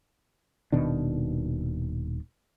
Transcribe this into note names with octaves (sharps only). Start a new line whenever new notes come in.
D#1 B2 D#3 D4